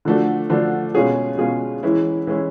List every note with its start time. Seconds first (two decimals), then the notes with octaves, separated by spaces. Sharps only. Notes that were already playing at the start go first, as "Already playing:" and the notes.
0.05 D3 F3 A3 D4 F#4
0.50 D3 F3 A3 D4 F#4
0.95 B2 G#3 C#4 F4 G#4
1.38 B2 G#3 C#4 F4 G#4
1.83 E3 G#3 C#4 E4
2.27 E3 G#3 C#4 E4